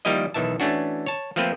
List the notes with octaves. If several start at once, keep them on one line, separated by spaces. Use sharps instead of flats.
D#3 F3 G3 A#3 E4 D#5
B1 D#3 E3 E5 A5
E3 A3 C#4 D4 F#4
C#5 A5
F3 A3 A#3 C4 B4